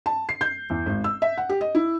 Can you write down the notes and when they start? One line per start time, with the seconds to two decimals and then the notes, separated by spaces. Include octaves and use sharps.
0.06 A5
0.29 C7
0.41 G6
0.70 E2
0.86 G#1
1.04 E6
1.22 E5
1.37 F#5
1.49 G4
1.61 D#5
1.75 E4